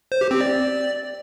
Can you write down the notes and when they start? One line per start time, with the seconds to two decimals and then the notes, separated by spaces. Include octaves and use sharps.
0.12 C5
0.21 G4
0.31 C4
0.40 D5